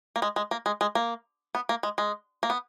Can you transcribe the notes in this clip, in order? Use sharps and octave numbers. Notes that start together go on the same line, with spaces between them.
A#3
G#3
G#3
A#3
G#3
G#3
A#3
B3
A#3
G#3
G#3
A#3
B3